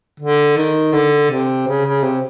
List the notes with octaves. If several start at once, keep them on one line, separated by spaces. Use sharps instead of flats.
D3
D#3
D3
C3
C#3
C#3
C3